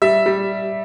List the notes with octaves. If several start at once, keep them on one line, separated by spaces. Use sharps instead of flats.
G3 E5
G3